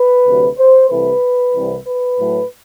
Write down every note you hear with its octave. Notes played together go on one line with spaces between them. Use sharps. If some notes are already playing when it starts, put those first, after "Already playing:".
Already playing: B4
D2 C3 F#3
C5
C2 C3 E3 A3 B4
C2 C3 E3 G3
B4
A2 F#3 A3